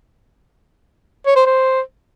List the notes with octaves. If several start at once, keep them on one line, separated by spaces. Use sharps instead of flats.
C#5
C5
C5